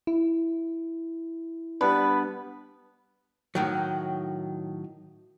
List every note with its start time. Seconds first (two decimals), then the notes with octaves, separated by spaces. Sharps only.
0.07 E4
1.81 G3 B3 D4 B4
3.55 A2 D#3 F#3